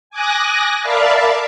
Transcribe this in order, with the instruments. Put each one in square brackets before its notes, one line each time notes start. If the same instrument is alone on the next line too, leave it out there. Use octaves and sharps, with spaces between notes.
[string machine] G#5 D6 D#6 F#6 A#6
A#4 D5 E5 F5 A5 B5